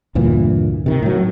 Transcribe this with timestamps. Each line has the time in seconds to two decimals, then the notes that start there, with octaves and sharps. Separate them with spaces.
0.15 D2 G2 A#2 E3
0.86 C3 D#3
1.02 A2 F#3